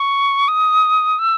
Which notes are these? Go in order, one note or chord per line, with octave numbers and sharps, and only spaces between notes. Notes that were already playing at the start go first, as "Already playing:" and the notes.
Already playing: C#6
D#6
E6